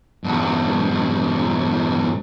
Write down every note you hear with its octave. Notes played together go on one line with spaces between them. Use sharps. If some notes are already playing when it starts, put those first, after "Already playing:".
E2 G2